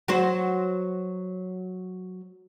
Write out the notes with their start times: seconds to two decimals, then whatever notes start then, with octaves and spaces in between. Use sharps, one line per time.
0.08 F#3 F#4 C5